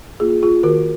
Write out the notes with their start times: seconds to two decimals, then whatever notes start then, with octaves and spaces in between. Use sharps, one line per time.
0.20 A#3 F4 G#4
0.43 F4 G#4
0.63 D#3 F#4 A#4